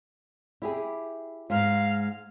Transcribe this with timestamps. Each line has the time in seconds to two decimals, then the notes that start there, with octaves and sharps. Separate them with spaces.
0.62 E4 G4 G#4
1.50 G#2 G#3 F5